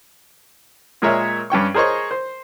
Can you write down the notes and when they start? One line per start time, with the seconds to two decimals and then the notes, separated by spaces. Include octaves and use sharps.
1.02 A#2 G#3 G#4 A#4 C#5 E5
1.50 G2 C#4 G5 C#6
1.74 G#4 A#4 C5 C#5 D#5 C#6
2.11 C5